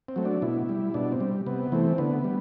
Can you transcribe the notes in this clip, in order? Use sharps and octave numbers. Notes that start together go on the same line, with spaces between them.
C4
F#3 A3
D4
B2 E4
G3
B2 D4
C4
G3
C3 B3
E3 A3 C4
D3 B3
G3